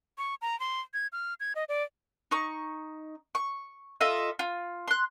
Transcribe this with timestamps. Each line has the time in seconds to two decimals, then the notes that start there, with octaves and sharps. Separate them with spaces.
0.18 C#6
0.42 A#5
0.60 C6
0.94 G#6
1.12 F6
1.40 G#6
1.55 D#5
1.69 D5
2.31 D#4 C#6
3.35 C#6
4.01 F4 A4 D#5 E5
4.39 F4
4.88 C6 F#6